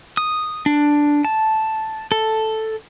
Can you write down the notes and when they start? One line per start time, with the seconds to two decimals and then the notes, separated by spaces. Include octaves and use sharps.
0.17 D#6
0.66 D4
1.25 A5
2.12 A4